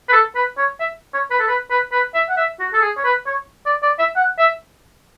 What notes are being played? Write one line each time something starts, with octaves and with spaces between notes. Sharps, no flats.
B4
A4
B4
C#5
E5
C#5
B4
A4
B4
B4
B4
E5
F#5
E5
F#4
A4
G#4
C#5
B4
C#5
D5
D5
E5
F#5
E5